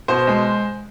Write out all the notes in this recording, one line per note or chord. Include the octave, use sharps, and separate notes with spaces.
B2 C5
G#3